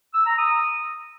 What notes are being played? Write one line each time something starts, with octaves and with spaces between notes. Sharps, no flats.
E6
A#5
D#6